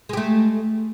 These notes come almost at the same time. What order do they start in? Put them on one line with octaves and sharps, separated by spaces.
G#3 G4 A3